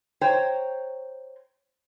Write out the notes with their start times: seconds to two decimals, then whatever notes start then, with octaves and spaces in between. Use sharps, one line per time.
0.21 C5 C#5 G5 A#5